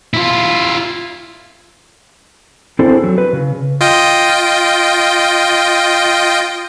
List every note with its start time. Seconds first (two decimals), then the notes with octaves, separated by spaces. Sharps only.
0.14 E4 F4
2.79 C4 D4 E4 G#4 A4 C5
3.04 F#3
3.18 B4
3.33 C#3
3.81 F4 D#5 G5